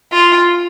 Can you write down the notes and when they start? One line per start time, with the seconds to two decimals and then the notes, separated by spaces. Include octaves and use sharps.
0.13 F4